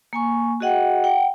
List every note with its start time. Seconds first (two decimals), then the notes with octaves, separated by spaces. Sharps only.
0.13 A#3 G#5 C#6
0.60 F#4 G#4 D#5 F#5 G5
1.04 F#5 G5